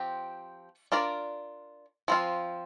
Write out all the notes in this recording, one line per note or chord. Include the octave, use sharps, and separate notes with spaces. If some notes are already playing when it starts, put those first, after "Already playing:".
Already playing: F3 C4 G4
D4 F4 A#4 D5
F3 C4 F4